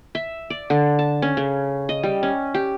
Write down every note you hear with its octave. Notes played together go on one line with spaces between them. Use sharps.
E5
D5
D3
A5
C#4
C#3
D#5
G3
C#4
G4